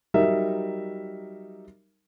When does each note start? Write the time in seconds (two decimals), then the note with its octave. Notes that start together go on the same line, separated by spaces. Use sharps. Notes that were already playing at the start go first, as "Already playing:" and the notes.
0.14 F#3 G3 D#4 A#4 E5